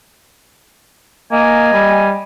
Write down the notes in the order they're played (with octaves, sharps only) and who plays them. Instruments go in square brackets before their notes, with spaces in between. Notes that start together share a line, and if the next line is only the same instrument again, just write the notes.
[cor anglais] A#3 [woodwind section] D#5 G#5
[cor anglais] G3